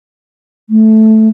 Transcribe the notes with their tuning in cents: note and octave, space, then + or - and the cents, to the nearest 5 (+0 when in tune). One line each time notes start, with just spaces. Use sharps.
A3 -5